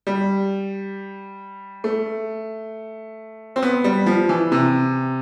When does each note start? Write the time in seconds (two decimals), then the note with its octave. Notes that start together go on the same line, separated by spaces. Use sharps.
0.07 G3
1.84 A3
3.56 C4
3.63 B3
3.84 G3
4.06 F3
4.29 E3
4.52 C3